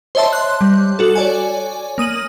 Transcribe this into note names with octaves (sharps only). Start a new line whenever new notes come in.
C5 C#5 D#5 E5 A5 C6
C6 F#6
G3
F#4 A4
C#5 D5 G#5
A#3 D#6 D#7 F#7